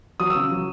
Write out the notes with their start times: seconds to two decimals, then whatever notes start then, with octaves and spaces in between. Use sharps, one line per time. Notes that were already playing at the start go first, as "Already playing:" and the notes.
0.20 F#3 D#6
0.30 E6
0.35 C#3
0.51 F#3